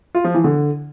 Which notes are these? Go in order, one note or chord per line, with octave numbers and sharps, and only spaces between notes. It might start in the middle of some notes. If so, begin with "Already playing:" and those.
F4
F3
E3
D3